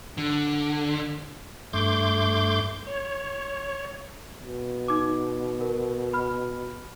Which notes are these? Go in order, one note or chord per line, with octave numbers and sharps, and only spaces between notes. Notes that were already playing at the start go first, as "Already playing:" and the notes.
D3
G2 A3 C6 D6 G6
C#5
B2
D#4 D6
A#4
B5 F6